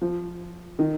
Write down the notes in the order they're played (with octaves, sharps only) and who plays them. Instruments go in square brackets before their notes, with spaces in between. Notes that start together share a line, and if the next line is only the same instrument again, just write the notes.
[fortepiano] F3
D#3